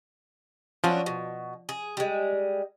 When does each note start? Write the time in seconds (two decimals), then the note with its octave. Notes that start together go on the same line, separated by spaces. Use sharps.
0.84 F3 F#3 C#4 D4
1.06 B2
1.69 G#4
1.97 G3 G#3